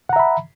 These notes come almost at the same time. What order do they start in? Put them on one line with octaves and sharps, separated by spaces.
F#5 A#5 E5 B5